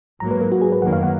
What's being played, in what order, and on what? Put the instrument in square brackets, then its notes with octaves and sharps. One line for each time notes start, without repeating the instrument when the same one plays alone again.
[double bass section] G#2 F#3 A#3 [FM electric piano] A#5
[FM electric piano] B4
A#4
F#4
G#4
B4
[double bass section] F#2 D#3 F#3 A#3 [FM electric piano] F#5
[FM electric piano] F5
F#5